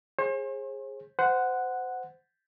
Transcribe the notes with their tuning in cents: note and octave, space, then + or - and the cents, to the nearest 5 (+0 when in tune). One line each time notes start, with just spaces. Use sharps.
G#4 -10 C5 +45
C5 -25 F#5 +0